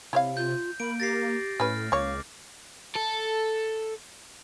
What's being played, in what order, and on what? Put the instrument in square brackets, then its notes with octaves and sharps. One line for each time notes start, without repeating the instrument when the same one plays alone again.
[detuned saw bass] C3 [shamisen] E4 C#5 F5
[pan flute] F4 [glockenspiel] G6
[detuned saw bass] A#3 [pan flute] B5 [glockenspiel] D7
[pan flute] G4 [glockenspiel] A6 A#6 C7
[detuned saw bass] A2 [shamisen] C#4 B4 [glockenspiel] F6
[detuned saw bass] C#2 [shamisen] A#3 C#5 [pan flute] F5 [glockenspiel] D6
[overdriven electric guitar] A4